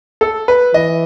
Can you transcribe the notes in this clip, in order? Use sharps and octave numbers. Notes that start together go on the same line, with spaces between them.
A4
B4
E3 D#5